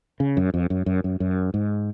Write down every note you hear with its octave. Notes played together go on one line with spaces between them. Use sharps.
C#3
F#2
F2
F#2
F#2
F#2
F#2
G#2